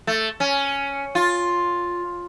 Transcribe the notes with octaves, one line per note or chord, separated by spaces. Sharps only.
A3
C#4
F4